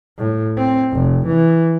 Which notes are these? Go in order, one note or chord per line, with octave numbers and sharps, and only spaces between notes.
A2
C4
F1
E3